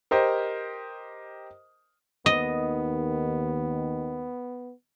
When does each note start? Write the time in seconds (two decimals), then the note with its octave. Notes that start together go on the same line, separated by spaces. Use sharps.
0.11 G4 A#4 C5 D#5
2.26 D#2 D#3 B3 D#5